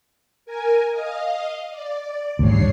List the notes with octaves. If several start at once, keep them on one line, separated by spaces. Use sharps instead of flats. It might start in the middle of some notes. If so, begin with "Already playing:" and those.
A#4 G#5
D#5 F5
D5
G#1 D2 G2 C#5 C7